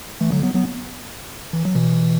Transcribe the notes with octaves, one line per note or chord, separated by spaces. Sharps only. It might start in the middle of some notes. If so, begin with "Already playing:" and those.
E3 A3
D3 F#3
F#3 B3
F#3 B3
E3
F#3
B2 E3